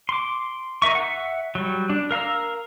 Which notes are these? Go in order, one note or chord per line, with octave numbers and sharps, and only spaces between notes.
C6 D6
D#4 A#4 E5 C#6
E5 F#5
F#3 G3
D4
A#4 F5 A#5 E6